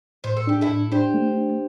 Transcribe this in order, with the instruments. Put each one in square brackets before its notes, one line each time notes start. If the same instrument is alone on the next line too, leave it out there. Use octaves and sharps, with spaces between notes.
[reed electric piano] A2 [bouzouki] C5
[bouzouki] A4
[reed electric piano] D4 [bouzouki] G4
[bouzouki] E4 A4
[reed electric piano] A2
[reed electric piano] D4 [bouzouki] G4 C5
[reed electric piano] A3
D4